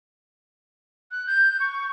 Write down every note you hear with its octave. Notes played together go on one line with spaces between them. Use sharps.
F#6
G6
C#6